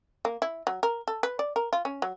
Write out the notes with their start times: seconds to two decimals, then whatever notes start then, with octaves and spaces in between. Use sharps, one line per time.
0.25 A#3
0.42 E4
0.67 F#3
0.83 A#4
1.08 A4
1.23 B4
1.39 D5
1.56 A#4
1.73 F4
1.85 C#4
2.02 F#3